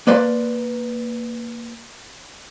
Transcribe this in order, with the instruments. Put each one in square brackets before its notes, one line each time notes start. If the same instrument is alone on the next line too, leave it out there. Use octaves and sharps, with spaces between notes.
[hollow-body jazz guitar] A#3 B4 D5 C6